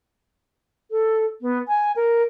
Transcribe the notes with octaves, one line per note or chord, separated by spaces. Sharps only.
A4
B3
G#5
A#4